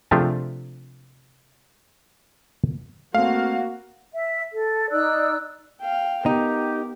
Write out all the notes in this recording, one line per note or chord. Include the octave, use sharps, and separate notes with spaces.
C3 F3 A3 D4 G4 G#4
A3 A#3 C4 F#4 F5
E5
A4
D#4 D5 E6 F#6
F5 G5
B3 D#4 G4 A#4